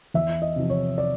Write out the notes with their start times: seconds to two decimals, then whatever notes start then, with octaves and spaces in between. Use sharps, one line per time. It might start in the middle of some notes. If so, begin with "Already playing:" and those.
0.14 E2 E5
0.42 D#5
0.56 C3 F3
0.70 C#5
0.98 D5